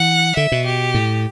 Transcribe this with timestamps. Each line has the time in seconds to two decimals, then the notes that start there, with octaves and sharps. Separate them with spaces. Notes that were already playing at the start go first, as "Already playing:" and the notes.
Already playing: E3 F#5
0.36 D3 E5
0.52 B2
0.66 G4
0.94 A2